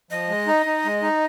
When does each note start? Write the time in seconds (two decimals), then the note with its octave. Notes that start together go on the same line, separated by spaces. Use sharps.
0.10 F3 D#5
0.28 G#3
0.47 D#4
0.66 D#4
0.85 G#3
1.02 D#4